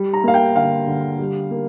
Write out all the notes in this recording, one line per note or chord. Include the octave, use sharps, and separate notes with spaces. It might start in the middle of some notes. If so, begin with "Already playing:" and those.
Already playing: G3
A#5
A#3 F5
G5
D3 F5
D3
G3
A#3